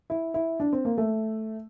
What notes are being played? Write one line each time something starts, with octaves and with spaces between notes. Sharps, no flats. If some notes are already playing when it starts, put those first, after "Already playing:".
E4
E4
D4
C4
A#3
A3